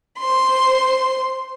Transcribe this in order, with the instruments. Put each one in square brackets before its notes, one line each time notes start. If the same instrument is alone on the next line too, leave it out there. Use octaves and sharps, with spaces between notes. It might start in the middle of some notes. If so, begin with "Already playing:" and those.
[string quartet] C5 C6